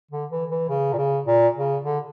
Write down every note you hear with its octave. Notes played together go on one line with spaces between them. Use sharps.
D3
E3
E3
C#3
A#2
C#3
A#2
C#3
D3